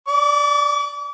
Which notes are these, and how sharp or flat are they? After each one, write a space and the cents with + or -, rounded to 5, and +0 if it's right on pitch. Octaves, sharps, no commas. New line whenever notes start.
D5 +0 D6 -40